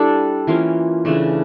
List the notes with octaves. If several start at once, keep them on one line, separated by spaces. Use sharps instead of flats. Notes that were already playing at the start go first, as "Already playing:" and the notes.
Already playing: G3 D4 E4 A4
E3 A#3 C#4 F4
C#3 E3 A3 D4